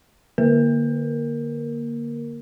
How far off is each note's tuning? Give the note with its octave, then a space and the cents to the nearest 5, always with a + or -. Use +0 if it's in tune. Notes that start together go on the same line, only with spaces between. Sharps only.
D3 +0 A#3 +10 A#4 +0